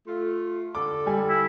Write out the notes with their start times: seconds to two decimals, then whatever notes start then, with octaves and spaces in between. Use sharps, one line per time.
0.07 A3 F4
0.75 D3 A4 D6
1.06 G3 G#5
1.29 E4